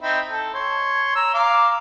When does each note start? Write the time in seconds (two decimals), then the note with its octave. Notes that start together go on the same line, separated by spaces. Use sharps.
0.01 C4 D#4 E4
0.29 A4
0.54 C#5 C6
1.16 A#5 E6
1.34 F5 A#5 D6